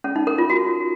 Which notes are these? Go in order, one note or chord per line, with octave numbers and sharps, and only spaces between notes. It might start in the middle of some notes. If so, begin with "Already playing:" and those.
C#4
D#4
A#4
F4
F#4